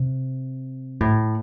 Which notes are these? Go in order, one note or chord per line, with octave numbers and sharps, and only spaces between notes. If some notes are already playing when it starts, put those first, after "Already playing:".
Already playing: C3
A2